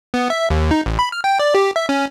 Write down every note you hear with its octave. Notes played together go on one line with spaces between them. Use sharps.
B3
E5
D#2
D#4
A1
B5
F6
G5
D5
G4
E5
C#4